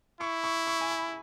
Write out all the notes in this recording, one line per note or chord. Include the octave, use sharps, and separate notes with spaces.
E4 C#6
C#6
C#6
G#5
B5